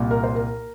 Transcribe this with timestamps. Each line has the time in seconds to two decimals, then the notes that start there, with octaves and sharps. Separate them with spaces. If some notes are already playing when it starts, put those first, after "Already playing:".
Already playing: C2 A#2
0.11 A#4
0.24 C5
0.35 A#4